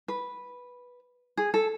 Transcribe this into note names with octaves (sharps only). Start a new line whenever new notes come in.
B4
G#4
A4